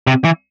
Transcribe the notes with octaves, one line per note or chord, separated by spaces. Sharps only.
C3
E3